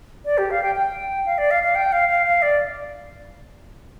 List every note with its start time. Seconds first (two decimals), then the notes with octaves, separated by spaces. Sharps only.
0.25 D5
0.38 G4
0.51 F5
0.63 G5
0.76 G5
1.26 F5
1.38 D5
1.51 F5
1.63 F5
1.75 G5
1.92 F5
2.09 F5
2.26 F5
2.42 D5